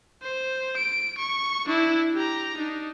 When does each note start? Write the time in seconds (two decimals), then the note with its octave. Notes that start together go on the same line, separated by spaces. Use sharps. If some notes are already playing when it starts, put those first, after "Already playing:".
0.23 C5
0.77 D7
1.18 C#6
1.66 D4 E4
2.14 G4 A#5
2.57 D4 D#4